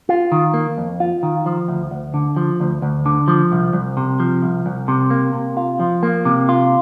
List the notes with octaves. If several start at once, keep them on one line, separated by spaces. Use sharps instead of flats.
F4
D#3
A#3
F2
F4
D#3
F3
D2
D2
D3
F3
D2
D2
D3
F3
C2
C2
C3
F3
C2
C2
C3
A#3
C3
F4
F3
A#3
C3
F4